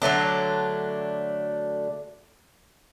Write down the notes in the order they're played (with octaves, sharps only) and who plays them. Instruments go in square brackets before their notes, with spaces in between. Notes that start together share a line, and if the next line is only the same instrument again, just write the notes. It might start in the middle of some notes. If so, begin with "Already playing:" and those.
[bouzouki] D3 F#3 A3 D4